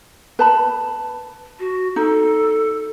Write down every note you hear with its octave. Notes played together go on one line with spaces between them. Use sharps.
B4 A5 B5
F#4
D#4 A4